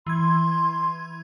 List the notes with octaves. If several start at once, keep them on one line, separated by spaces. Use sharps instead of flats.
E3 C6 G#6